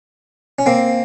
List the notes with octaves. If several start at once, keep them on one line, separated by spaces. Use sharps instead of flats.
C#4
A#3 C4